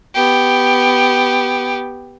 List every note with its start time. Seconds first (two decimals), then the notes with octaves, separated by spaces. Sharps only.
0.14 B3 G4